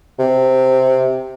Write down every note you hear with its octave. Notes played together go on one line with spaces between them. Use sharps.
C3